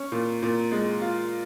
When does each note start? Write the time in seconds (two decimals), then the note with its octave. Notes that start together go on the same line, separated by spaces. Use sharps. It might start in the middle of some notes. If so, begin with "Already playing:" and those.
Already playing: C#4
0.12 A#2
0.42 A#2
0.72 G#3
1.01 F4